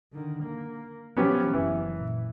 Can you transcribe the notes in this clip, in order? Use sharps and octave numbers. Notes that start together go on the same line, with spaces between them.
D3 D#3
A#3
F3 F#3 B3 C#4 G4
F#1 E3
A#2